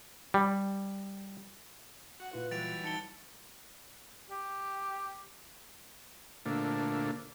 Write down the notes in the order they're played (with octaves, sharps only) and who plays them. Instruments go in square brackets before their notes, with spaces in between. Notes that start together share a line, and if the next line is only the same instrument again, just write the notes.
[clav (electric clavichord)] G3
[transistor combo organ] F#4 [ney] F#5
[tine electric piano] A#2 E4 F4 [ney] B4
[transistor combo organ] E3 F#3 G3 [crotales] A6 D7 F7
[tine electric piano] D#4 [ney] A5 [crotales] A6 C#7 G7
[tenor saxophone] G4
[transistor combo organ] A#2 D3 A3 A#3 D4